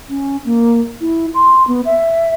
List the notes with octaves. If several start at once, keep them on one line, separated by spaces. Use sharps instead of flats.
C#4
A#3
E4
C6
B3
E5